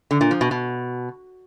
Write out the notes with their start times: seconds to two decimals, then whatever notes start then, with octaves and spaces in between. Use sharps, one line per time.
0.11 D3
0.21 A#2
0.31 F3
0.41 B2
0.51 B2